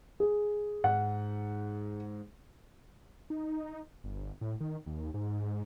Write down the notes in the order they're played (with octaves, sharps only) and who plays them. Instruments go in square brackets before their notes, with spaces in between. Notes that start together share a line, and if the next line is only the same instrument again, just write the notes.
[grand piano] G#4
[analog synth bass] G#2 [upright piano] F#5
[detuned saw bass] D#4
G1
A2
D#3
D#2
G#2